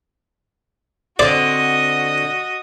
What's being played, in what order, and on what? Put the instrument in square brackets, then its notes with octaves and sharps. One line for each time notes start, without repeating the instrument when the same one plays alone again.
[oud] D3 C4 [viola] F#4 D#5 [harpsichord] D5